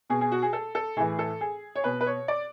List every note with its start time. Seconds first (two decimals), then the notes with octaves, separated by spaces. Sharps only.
0.10 B2 G#4
0.21 G#4
0.32 F#4
0.42 G#4
0.53 A4
0.75 A4
0.97 A2 E3 G#4
1.19 A4
1.41 G#4
1.75 C#5
1.84 B2 B4
2.01 B4
2.06 C#5
2.28 D5